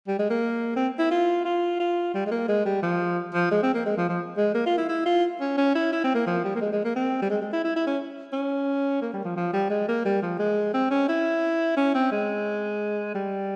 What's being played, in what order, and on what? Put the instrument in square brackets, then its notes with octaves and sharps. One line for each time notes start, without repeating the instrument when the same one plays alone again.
[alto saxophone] G3
G#3
A#3
C4
E4
F4
F4
F4
G3
G#3
A#3
G#3
G3
F3
F3
G#3
C4
A#3
G#3
F3
F3
G#3
A#3
F4
E4
E4
F4
C#4
C#4
E4
E4
C4
A#3
F3
G3
A#3
G#3
G#3
A#3
C4
G3
G#3
G#3
E4
E4
E4
C#4
C#4
A#3
G3
F3
F3
G3
G#3
A#3
G3
F3
G#3
C4
C#4
E4
C#4
C4
G#3
G3